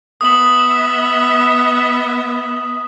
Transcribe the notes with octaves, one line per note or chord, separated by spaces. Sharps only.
B3 E5 D#6 F#7